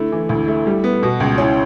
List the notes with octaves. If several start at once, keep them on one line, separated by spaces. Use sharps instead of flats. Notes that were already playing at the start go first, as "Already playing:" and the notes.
Already playing: D3 A3 E4
E3
D2 E4
A3
G3
B3
B2 F#4
C#2
C#4 E4